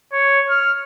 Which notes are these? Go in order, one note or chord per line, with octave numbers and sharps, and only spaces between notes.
C#5
F6